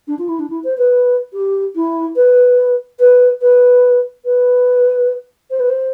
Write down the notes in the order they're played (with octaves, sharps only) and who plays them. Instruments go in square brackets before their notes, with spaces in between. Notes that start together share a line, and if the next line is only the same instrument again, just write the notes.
[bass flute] D4
F4
E4
D4
E4
C5
B4
G4
E4
B4
B4
B4
B4
C5
B4
C5